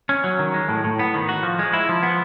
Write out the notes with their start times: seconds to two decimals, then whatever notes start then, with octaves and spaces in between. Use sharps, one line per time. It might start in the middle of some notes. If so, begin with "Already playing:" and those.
0.09 C#4
0.24 F#3
0.39 D#3
0.54 G#3
0.69 A2
0.84 A2
0.99 B3
1.14 D#3
1.29 F#4
1.43 F3
1.59 G#3
1.73 E4
1.89 F3
2.03 B3